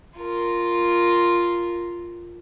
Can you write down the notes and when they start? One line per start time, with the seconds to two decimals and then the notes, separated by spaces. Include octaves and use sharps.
0.18 F4 A#4